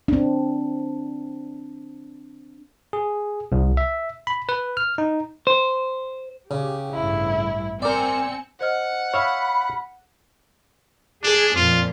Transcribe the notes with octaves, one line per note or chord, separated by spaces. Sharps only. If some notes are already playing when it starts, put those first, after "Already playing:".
C4 D4
G#4
C2
E5
B5
B4
F6
D#4
C5
C#3 G4
A1 G2 E4
C4 A#4 D5 G#5 E6 C#7
C5 D#5 F#5 F6
C#5 E5 F5 B5 F6
D4 G#4
F2 A#2 F4